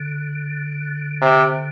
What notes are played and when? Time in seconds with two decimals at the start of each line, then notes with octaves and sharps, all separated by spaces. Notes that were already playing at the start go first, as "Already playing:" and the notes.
Already playing: D3
1.22 C3